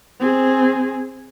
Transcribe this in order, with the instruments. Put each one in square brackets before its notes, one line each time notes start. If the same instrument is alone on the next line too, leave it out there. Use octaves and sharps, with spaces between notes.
[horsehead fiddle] C4 G#4